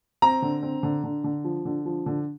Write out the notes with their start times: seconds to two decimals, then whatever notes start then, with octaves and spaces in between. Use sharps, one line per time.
0.22 C4 A#5
0.42 D3
0.63 C4
0.83 D3
1.04 D3
1.24 D3
1.44 F3
1.65 D3
1.85 F3
2.06 D3